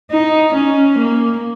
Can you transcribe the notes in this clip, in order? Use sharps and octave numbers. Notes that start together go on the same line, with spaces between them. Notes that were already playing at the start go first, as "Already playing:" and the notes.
D#4
C#4
A#3